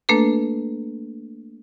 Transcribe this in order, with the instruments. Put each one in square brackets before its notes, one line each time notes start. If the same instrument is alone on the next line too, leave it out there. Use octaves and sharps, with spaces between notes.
[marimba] A3 A#3 D4 A4 B4